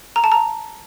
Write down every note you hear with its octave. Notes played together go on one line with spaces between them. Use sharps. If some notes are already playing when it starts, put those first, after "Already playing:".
A#5
A5
A#5